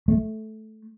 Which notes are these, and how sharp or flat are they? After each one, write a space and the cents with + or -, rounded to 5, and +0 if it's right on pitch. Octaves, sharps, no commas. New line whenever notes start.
A3 -15